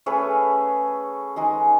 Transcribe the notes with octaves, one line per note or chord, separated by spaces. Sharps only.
A3 C#4 G#4 B4
G#3 D#4 G#4